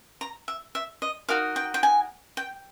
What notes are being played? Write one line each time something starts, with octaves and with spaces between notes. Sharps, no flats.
A#5
E5
E5
D#5
D#4 F#4 A#4 D#5 F5
G5
G5
G#5
G5